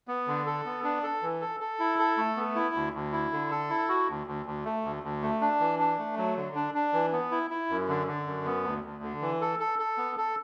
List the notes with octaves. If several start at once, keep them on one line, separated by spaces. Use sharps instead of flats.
B3
D3
A4
B3
D4
A4
E3
A4
A4
E4
A4
A3
B3
E4
D2
D2
E4
D3
A4
E4
F#4
D2
D2
D2
A3
D2
D2
A3
D4
E3
D4
A3
F#3
D3
D4
D4
E3
B3
E4
E4
F#2
D3
D3
F#2
B3
D2
D2
D3
E3
A4
A4
A4
B3
A4